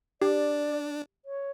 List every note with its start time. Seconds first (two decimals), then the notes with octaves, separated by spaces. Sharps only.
0.21 D4 G4 D5
1.25 C#5